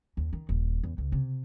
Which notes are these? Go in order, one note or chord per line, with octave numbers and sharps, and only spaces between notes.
D#2
D#3
D#1
E2
C#2
C3